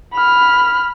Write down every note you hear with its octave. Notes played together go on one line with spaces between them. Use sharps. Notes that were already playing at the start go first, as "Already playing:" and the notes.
B5 F6